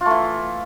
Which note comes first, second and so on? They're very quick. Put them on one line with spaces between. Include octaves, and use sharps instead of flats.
F4 A3 E3